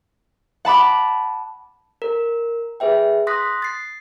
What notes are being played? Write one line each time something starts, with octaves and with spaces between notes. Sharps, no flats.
F#5 A5 B5 D6
A#4
G#4 B4 E5 G5
C6 D#6 F#6 A#6 B6
A6 C7